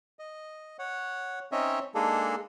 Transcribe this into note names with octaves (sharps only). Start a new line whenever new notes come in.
D#5
C#5 F#5
C4 C#4 D#4 C#5 D#5 E5
G#3 A#3 D4 D#4 G#4 A4